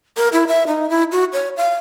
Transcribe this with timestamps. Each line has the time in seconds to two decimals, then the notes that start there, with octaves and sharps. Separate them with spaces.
0.17 A#4
0.33 E4
0.47 E5
0.67 D#4
0.90 E4
1.12 F#4
1.33 C#5
1.57 F5